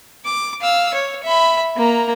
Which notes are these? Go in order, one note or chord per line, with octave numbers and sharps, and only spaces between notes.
D6
F5 E6
C#5
E5 B5
A#3 A#5